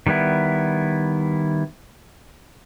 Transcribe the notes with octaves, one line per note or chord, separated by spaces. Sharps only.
D#3 G3 B3 E4